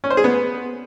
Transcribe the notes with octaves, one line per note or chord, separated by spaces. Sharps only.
C#4
C5
G#4
B3